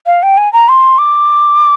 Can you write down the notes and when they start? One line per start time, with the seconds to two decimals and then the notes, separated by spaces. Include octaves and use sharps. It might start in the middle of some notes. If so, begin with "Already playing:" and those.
0.06 F5
0.23 G5
0.37 G#5
0.53 A#5
0.69 C6
0.98 D6